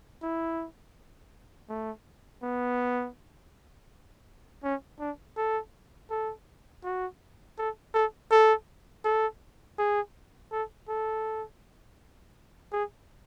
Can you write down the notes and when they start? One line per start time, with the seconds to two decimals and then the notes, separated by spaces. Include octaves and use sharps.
0.22 E4
1.69 A3
2.43 B3
4.63 C#4
4.99 D4
5.37 A4
6.10 A4
6.84 F#4
7.58 A4
7.94 A4
8.31 A4
9.04 A4
9.78 G#4
10.52 A4
10.88 A4
12.72 G#4